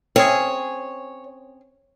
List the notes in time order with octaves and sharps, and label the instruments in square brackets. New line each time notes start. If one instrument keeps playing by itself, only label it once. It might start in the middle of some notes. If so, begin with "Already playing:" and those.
[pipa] C4 C#4 G#4 [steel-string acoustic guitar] C#5